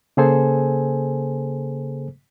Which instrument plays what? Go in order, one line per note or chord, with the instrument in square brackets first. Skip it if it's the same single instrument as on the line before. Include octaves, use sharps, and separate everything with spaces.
[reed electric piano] C#3 A#3 G#4 A4 C5 G#5